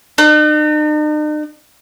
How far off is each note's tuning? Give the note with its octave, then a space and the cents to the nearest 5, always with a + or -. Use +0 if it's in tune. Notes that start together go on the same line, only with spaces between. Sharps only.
D#4 -45